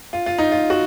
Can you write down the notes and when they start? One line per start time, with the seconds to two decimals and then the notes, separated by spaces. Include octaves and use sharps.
0.13 F4
0.26 F4
0.39 D#4
0.52 F4
0.70 F#4